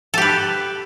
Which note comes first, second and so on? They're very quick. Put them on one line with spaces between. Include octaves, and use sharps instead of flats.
A4 G4 B4